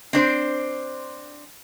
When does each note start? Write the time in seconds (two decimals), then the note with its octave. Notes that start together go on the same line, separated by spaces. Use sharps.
0.13 C4 D4 C5